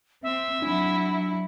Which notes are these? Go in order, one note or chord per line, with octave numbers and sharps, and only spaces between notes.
C4 E5
F#3 D4 E4